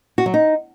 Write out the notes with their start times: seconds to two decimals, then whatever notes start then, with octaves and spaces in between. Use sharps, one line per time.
0.18 F#4
0.26 F#3
0.34 D#4